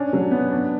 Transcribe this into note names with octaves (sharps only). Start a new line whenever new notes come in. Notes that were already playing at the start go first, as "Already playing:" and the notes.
Already playing: C#4 D4
F#3
B3
D4